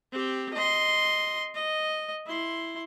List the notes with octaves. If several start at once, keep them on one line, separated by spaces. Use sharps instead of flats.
C4 G4
D#5 C6
D#5
E4 C6